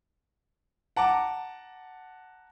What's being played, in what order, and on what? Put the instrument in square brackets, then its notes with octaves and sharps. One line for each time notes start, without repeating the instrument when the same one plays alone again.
[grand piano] F#5 A5 A#5 D6